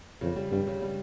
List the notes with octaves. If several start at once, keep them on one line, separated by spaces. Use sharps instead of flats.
F2 C#3
G3
G2 G3
C#3
G3